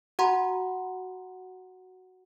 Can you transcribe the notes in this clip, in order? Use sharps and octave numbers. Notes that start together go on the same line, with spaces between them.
F#4 F#5 A#5 C6